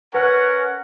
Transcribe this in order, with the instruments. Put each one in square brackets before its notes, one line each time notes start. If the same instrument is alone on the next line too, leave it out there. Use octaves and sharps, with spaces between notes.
[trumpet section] C#4 A#4 F#5 [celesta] B4